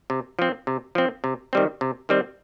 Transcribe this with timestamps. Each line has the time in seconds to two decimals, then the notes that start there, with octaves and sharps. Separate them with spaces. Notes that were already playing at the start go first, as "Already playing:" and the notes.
0.10 C3
0.39 F3 C4
0.67 C3
0.95 F3 C4
1.24 C3
1.53 D#3 G3 C4
1.81 C3
2.09 D#3 G3 C4